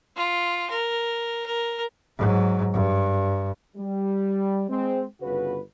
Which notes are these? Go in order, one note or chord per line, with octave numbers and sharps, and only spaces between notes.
F4
A#4
A#4
G#2 F#3
G2
G3
G#3 C4
G1 C#3 F#4 B4